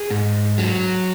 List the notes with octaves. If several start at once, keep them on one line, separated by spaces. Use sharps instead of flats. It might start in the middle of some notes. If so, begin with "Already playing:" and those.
Already playing: G#4
G#2
F#3